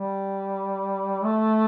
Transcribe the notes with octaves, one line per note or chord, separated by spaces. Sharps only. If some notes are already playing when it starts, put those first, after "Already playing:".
Already playing: G3
A3